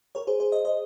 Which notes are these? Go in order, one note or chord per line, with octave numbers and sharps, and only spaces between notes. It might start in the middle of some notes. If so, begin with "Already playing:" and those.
A#4 C#5
G#4 C5
G#4 C5
C5 D#5
C5 D#5